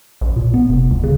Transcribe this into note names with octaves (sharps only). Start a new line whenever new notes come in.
A#1
A#2
B3
F1
C#2
C#3